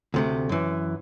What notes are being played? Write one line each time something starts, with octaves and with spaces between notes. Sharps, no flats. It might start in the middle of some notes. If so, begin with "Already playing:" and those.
D2 C3 A3
F#2 E3